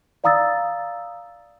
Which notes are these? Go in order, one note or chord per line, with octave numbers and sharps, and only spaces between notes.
D5 F5 A#5 D#6 E6 A6